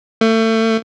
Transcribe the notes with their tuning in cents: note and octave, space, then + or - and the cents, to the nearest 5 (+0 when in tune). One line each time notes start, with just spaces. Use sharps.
A3 +30